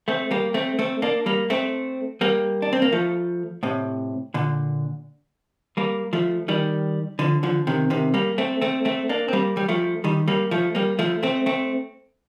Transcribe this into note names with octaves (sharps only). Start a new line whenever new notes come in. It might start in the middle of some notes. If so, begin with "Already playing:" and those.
A3 C4
G3 A#3
A3 C4
A3 C4
A#3 D4
G3 A#3
A3 C4
G3 A#3
D4
C4
A#3
F3 A3
A2 C3
A#2 D3
G3 A#3
F3 A3
D#3 G3
D3 F3
D3 F3
C3 D#3
C3 D#3
G3 A#3
A3 C4
A3 C4
A3 C4
A#3 D4
C4
G3 A#3
G3
F3 A3
D#3 G3
G3 A#3
F3 A3
G3 A#3
F3 A3
A3 C4
A3 C4